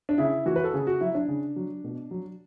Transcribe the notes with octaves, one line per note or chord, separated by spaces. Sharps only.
D4
C#3 E4
E3 F#4
B4
A4
C#3 G#4
F#4
F#3 E4
D4
C#3
F#3
B2
F#3